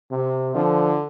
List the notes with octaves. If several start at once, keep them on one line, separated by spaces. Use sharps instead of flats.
C3
D3 F3